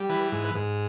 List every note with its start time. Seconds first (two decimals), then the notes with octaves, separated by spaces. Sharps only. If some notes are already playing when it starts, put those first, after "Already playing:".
Already playing: G3
0.09 E3 B4
0.32 G#2
0.44 B4
0.55 G#2